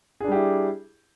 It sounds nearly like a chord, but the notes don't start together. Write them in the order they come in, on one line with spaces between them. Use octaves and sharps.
G#4 D4 G3 G4 E4